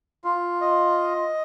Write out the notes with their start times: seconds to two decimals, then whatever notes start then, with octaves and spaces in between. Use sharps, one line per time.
0.24 F4
0.61 D#5